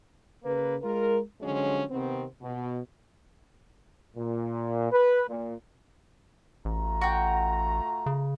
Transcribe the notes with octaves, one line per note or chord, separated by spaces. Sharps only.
C#3 A#3 B4
G#3 F4 A#4
D3 F3 F#3 G#3 C#4
C3 D#3 B3 C4
B2
A#2
B4
A#2
A1 A3 F4 A#5
F#4 G5
C#3